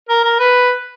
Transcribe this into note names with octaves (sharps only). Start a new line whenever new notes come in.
A#4
A#4
B4